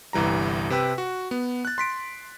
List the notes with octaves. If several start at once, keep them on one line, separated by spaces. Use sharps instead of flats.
G1 C2 E3 G3 A#5
C3 B4 G5 E6
F#4
B3
F#6 A6
C6 B6 D7